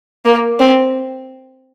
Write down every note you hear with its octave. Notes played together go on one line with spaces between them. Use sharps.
A#3
C4